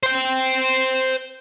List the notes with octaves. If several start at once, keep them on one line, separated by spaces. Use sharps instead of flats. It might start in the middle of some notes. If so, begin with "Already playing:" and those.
C5 G5